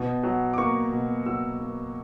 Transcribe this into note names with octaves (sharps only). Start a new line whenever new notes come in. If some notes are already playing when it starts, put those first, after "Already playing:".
Already playing: B2
F#3
D6
A#3 C#6
B2
F#3 E6
A#3